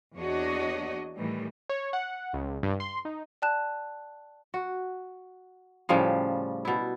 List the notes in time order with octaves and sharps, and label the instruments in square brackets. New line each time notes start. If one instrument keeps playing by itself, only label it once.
[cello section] E2 A#3 D4 F#4 C#5 D#5
A2 D#3 E3 G3
[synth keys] C#5
F#5
C#2
G2
C6
D#4
[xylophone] D5 G5 A5 F#6 E7
[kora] F#4
A2 C#3 F3 G3
B2 E4